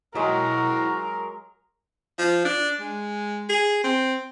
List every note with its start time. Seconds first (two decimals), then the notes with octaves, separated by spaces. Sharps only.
0.15 F#3 G#3 E4 F#4 A#4 G5
2.18 F3
2.45 D4
2.80 G#3
3.49 G#4
3.84 C4